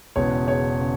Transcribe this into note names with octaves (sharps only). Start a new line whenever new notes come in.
E1 E2 C#3 C#5
C#5
C#3